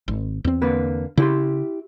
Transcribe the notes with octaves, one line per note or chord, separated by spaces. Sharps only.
G#1
E2 C4
D3 A#3 B4
C#3 E4 G4 C6